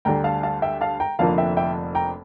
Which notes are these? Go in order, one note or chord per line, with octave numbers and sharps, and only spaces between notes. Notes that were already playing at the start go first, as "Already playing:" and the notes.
D2 D3 G3 G5 A#5
F5 A5
F5 A5
E5 G5
F5 A5
G5 A#5
F1 F2 D3 F3 A#3 F5 A5
E5 G5
E5 G5
G5 A#5